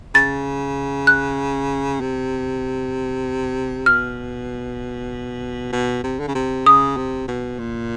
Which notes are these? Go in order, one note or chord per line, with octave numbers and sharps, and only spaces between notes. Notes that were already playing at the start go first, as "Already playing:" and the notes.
C#3 A6
F#6
C3
B2 F6
B2
C3
D3
C#3
C3
C#3 D#6
C3
B2
A#2